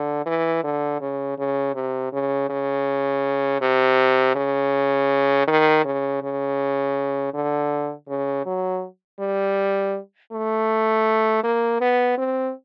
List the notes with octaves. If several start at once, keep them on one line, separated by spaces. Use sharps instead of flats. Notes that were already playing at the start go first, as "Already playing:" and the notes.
Already playing: D3
E3
D3
C#3
C#3
C3
C#3
C#3
C3
C#3
D#3
C#3
C#3
D3
C#3
F#3
G3
A3
A#3
B3
C4